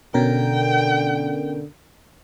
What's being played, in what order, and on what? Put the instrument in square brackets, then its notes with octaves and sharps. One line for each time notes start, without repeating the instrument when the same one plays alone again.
[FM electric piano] B2 C#4 A#4 [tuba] D3 [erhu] G5